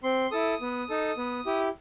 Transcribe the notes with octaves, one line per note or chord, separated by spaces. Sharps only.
C4 C6
E4 A4 D#6
B3
D#4 A4
B3
E4 G4